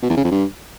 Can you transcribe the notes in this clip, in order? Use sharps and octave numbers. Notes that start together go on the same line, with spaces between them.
B2
E2
C#3
F2
G2